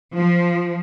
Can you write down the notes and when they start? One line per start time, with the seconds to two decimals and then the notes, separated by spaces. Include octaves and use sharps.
0.15 F3